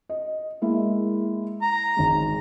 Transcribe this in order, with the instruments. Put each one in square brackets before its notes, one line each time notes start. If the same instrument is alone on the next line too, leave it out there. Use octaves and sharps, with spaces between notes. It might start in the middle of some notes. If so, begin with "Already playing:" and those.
[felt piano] D#5
G#3 A#3 E4
[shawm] A#5
[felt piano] G#1 G#3